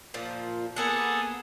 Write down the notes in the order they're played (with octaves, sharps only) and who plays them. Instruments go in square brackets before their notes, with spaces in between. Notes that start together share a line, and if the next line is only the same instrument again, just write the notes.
[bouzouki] A#2 F3 F4
[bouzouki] A#3 B3 F#5 [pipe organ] G#4 A4